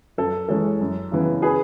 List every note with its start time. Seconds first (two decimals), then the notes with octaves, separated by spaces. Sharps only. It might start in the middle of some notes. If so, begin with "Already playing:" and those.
0.18 F#2 A4
0.49 E3 G#3 C#4 A4
0.81 F#2
1.12 C#3 E3 B3
1.42 G#4 B4